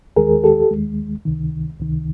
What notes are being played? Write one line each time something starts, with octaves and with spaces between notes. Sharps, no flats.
D#2 D#3 G#3 G#4 A#4
G4 A4
D#2 D#3 G#3
C#2 C3 D#3
C#2 C3 D#3